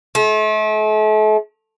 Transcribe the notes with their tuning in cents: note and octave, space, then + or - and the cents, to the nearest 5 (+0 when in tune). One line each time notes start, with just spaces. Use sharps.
A3 -40